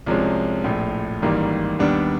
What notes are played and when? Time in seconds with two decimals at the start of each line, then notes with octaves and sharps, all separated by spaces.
0.06 C2 C3 F3 G#3 C#4
0.64 A#1 A2 F3
1.22 A1 G#2 D#3 G3 A#3
1.79 D#2 D#3 G3 B3 D4